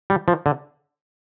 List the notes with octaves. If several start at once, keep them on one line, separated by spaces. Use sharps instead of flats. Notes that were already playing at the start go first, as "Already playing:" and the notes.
G3
F3
D3